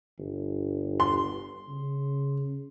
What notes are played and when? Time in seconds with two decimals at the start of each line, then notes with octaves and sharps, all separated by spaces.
0.18 G1
1.00 C6
1.69 C#3